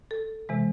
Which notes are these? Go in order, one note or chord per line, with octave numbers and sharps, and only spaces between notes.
A4
C3 E3 G#3